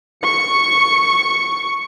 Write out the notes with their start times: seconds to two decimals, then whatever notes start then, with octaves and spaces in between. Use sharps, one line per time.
0.23 C#6 C#7